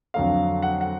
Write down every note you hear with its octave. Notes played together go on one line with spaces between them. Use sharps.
F2 D3 F#3 A3 F5
F#5
F#5